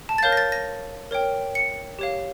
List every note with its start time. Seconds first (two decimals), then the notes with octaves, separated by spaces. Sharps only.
0.09 A5
0.18 A6
0.23 A#4 C#5 F5 G6
0.32 A#6
0.37 A6
0.52 A#6
1.11 A#4 C#5 G5
1.55 C#7
1.99 G4 C#5 F5